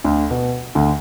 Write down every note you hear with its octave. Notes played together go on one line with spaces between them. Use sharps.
D2 D3
B2
D2 D3